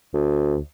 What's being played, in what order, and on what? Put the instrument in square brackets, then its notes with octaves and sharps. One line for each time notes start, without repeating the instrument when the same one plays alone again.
[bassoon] D2